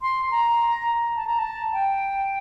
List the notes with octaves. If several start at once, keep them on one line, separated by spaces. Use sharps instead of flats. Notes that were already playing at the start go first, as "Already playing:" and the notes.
C6
A#5
A5
A#5
A5
G5